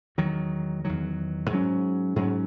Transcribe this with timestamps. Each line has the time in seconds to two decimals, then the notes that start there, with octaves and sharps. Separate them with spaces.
0.18 E2 D#3 F#3
0.85 E2 D#3 F#3
1.50 G#2 F#3 C#4
2.16 G#2 F#3 C#4